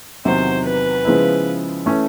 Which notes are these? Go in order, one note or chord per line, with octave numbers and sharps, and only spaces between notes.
E2 C3 D#3 F#3 C5
B4
C#3 F3 G#3 B3 E4
E3 A3 C#4